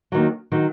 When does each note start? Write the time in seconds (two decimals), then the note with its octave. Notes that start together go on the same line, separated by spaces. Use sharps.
0.12 D#2 D#3 F#3
0.52 D#3 F#3